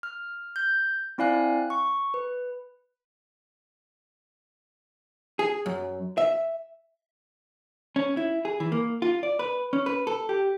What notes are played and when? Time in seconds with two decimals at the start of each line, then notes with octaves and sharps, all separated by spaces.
0.03 F6
0.56 G6
1.18 C4 E4 D5 F5 G#5 F#6
1.70 C#6
2.14 B4
5.39 G#4
5.66 F#2
6.18 E5
7.96 C#4
8.17 E4
8.45 G#4
8.60 E3
8.72 A#3
9.02 F4
9.23 D5
9.39 B4
9.73 C#4
9.86 B4
10.07 A4
10.29 G4